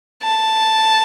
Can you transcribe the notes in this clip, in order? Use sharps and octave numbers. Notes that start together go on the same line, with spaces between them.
A5